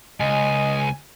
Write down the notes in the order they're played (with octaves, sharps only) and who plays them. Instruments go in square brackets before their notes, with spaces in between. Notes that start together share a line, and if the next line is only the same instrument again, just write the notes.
[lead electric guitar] C#2 [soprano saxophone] D#5 [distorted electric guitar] G#5